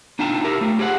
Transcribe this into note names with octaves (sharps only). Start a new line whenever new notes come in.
D4 D#4 F4 G5 A5 A#5
E4 G4 A#4
A3 F4
G4 G#4 C5 E5 F#5